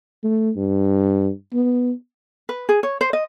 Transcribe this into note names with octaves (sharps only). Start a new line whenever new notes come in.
A3
G2
B3
B4
G#4
C#5
C5
D#5